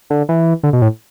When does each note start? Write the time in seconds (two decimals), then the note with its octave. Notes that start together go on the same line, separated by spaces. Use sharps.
0.10 D3
0.29 E3
0.63 D3
0.73 B2
0.82 A2